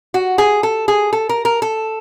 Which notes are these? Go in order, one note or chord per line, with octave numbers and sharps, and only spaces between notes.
F#4
G#4
A4
G#4
A4
A#4
A#4
A4